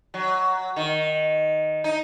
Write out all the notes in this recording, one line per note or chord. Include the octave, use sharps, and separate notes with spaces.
F#3
D#3
D#4